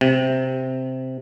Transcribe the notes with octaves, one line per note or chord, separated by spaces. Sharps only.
C3